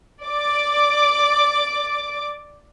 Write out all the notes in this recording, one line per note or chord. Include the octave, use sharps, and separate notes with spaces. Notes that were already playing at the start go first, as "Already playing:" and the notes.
D5 D6